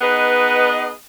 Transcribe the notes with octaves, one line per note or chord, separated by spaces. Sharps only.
B3 D#4 G#4 B4 D#5